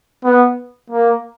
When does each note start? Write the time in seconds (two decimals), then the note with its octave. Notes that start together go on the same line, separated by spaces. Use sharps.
0.25 B3
0.90 A#3